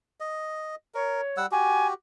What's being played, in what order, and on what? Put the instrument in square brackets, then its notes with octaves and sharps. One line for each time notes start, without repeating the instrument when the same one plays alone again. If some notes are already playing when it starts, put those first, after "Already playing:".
[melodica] D#5
[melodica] A#4 [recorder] C#5
[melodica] G3 F#5 E6
[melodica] F#4 G4 [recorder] G#5